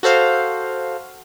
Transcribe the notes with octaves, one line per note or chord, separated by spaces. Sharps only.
F#4 A4 C5 F5